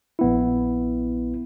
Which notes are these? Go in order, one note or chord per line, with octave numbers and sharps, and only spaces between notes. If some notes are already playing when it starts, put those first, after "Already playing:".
A#1 B3 E4